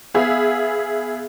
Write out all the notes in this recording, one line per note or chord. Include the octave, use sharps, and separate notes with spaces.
B3 G#4 E5 F5